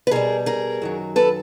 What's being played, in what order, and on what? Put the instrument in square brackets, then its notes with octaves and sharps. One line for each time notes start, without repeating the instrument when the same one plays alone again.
[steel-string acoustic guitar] B4
B2 G3 G#4 A#4
G#4 A#4
F#2 D#3 F#3
A4 B4